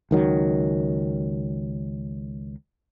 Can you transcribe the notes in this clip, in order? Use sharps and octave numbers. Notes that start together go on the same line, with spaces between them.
C#2 D#3 F#3